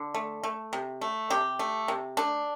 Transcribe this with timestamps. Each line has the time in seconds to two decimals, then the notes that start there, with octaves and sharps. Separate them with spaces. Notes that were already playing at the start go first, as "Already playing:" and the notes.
Already playing: D3
0.15 A3
0.44 A3
0.73 C3
1.01 A3
1.30 C3 G4
1.59 A3
1.88 C3
2.17 A3 D4